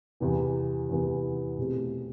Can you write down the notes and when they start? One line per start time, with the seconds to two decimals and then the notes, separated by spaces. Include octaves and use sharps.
0.20 E2 C3 E3 B3
0.89 E2 C3 E3 B3
1.58 B2 A3 C4 G4